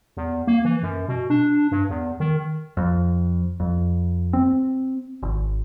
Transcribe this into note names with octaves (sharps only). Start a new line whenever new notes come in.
E2
A#3
E3
F#2
B2
D4
G2
E2
D#3
F2
F2
C4
G#1